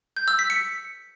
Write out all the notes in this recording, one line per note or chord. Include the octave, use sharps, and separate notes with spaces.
G6
E6
B6
C#7